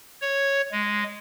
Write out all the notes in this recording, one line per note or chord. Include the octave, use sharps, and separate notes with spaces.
C#5
G#3